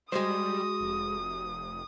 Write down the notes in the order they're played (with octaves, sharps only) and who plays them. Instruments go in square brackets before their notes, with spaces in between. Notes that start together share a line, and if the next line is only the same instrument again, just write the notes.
[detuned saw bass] G3 [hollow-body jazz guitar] G#3 C5 [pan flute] F#4 [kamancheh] D#6
[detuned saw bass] F1